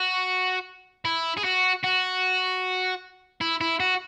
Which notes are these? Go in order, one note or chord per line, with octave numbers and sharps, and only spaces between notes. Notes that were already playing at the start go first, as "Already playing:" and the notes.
Already playing: F#4
E4
G#4
F#4
F#4
E4
E4
F#4